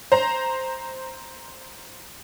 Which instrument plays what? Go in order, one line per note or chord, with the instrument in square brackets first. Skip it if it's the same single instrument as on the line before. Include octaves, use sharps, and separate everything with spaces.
[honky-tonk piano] C5 A#5